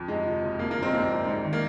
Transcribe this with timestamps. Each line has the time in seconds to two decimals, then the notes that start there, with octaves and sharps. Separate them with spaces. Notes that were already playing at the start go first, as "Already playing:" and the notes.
Already playing: F2
0.08 C3 G#3
0.26 F3
0.42 F#1
0.59 C3 A#3
0.71 A#3
0.77 F3
0.82 G#3 C4
0.93 C2 A#3
1.10 C2
1.27 G#2
1.44 D#3
1.53 A#3